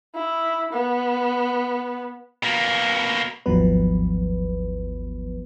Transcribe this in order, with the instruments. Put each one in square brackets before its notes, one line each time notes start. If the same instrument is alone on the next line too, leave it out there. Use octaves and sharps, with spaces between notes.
[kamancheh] E4
B3
[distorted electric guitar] B2 A#3
[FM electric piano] G#1 D#2 F3 F#3 B3 B4